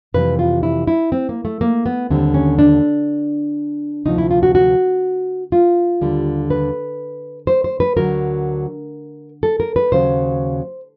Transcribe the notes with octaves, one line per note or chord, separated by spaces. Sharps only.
F2 C3 E3 G3 B4
F4
E4
E4
C4
A#3
A3
A#3
B3
D#2 D3 G3 C4
C#4
D4
D2 C3 F3 D#4
E4
F4
F#4
F#4
F4
D#2 D3 G3
B4
C5
C5
B4
D2 D3 F#3 A#4
A4
A#4
B4
D#2 C#3 F#3 C5